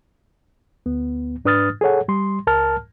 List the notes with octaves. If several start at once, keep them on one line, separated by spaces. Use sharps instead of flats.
D2 B3
G#2 D4 B4 D#6 F6 A6
G#4 A4 C#5 F#5
G3 C6
C#2 A#4 A5 F6